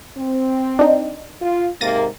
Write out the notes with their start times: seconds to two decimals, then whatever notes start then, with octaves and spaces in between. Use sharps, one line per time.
0.16 C4
0.79 D4 D#4
1.41 F4
1.81 G#2 C3 A#3 A6 A#6 D#7